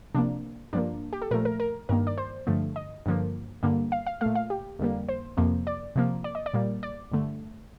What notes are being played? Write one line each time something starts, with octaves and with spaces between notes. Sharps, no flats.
C3 F3 A#3 D4
G2 F3 A#3 D4
G4
A4
A#2 F3 A3 A#4
A#4
A#4
G2 D#3 A#3 A#4
D5
C5
G2 D3 F3 A3
D#5
G2 D3 F3 A#3
G2 D3 G3 A#3
F5
F5
A#2 A3 F5
F5
G4
F2 D3 G3 A#3
C5
F2 C3 F3 A#3
D5
C3 F3 A#3
D5
D#5
D5
A#2 G3 A#3
D5
G2 D3 A3